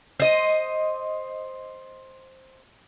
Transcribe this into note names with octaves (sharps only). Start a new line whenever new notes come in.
C5 D#5